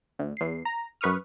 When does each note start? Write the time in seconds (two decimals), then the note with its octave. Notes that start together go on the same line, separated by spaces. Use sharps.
0.19 D2
0.37 E2 C7
0.65 A#5
1.01 F#2 B4 C#6 D#6 F6